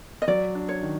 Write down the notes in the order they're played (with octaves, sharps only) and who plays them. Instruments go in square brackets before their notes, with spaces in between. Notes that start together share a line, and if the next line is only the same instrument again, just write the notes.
[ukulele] D#5
[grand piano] F#3 [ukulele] D5
[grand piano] D4
[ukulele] C#5
[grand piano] D#3